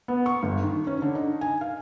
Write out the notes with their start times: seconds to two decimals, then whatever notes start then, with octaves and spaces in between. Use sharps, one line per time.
0.08 B3
0.26 C#6
0.43 G1
0.63 D#3
0.87 C#4
1.02 D3
1.15 D#4
1.41 G#5
1.61 F5